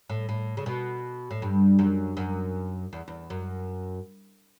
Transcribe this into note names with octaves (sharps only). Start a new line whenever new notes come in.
A2
A2
C#3
B2
A2
G2
F#2
F#2
E2
E2
F#2